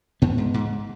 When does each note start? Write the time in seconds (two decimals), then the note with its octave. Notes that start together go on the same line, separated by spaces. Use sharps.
0.22 G#2 B3
0.38 G#2
0.54 G#2